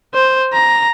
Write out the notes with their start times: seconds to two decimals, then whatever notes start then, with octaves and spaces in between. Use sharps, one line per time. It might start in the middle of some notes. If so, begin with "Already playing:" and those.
0.14 C5
0.53 A#5